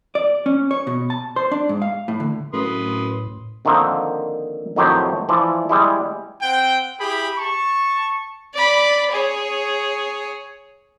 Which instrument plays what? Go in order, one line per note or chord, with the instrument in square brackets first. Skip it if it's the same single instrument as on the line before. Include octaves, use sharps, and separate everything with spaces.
[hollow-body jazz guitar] D5
C#4
C#5
B2
A5
C5
D4
G#2
F5
A2
D3
[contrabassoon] F#2 [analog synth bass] A2 [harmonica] B4 C6 D#6
[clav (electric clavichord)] D3 D#3 F3 A#3 C4
F2 A2 D#3 F#3 G4 C5
E3 F3 D5
G3 G#3 E4
[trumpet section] C4 F#5 G5
E4 G4 G#4 G5 B5
A5 C#6
[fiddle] D5 B5
G#4 C#5